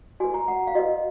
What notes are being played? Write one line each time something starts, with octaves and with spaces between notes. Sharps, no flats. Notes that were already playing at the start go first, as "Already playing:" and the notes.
F#4 B4 G#5
A#5
F#5
F5
F#4 B4 D#5